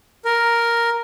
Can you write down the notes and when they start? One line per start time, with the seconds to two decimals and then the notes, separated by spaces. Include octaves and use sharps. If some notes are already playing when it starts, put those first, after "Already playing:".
0.25 A#4